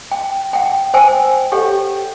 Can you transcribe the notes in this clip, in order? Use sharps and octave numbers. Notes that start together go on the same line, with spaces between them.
G5
F#5 G5
C5 G5 G#5 E6
G4 A4 C#5 F#5 G5